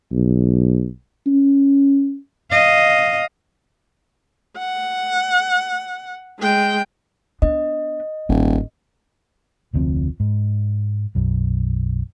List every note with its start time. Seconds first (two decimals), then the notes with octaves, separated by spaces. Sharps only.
0.12 B1
1.27 C#4
2.51 D#5 F5
4.58 F#5
6.39 G#3 G5
7.42 B3 D4 D#5
8.29 D#1 G#1
9.73 F1 D2 F3 C4
10.20 G#2
11.15 B1 F#2